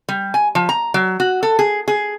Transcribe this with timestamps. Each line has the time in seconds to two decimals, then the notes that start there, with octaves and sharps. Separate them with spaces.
0.09 G3
0.34 G#5
0.55 F3
0.69 A#5
0.94 F#3
1.20 F#4
1.43 A4
1.59 G#4
1.88 G#4